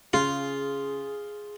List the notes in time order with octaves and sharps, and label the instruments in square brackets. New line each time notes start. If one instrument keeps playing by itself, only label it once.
[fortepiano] C#3 [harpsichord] F4 [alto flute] G#4